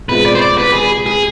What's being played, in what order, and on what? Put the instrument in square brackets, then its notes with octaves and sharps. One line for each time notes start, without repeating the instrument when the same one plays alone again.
[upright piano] B2 G#3 C4 F4 [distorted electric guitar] B4
[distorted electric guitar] D5
C5
D5
B4
G#4
G#4